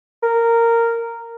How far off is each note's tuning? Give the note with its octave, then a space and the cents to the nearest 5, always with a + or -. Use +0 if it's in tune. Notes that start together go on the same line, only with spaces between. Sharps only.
A#4 -10